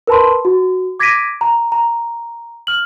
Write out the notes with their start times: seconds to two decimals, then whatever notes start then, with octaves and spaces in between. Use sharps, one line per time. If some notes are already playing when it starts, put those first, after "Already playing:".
0.07 A#4 B4 A5 B5 C6
0.45 F#4
1.00 D6 G#6 A#6 B6 D7 D#7
1.41 A#5
1.72 A#5
2.67 F6 F#7